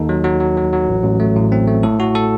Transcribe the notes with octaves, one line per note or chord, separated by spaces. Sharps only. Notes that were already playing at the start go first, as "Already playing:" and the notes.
Already playing: D#2 D#4 A4
F#3
F#3
F#3
F#3
F#3
A1
A1
A3
A2
C4
A3
A2 A4
A2 F#4
A4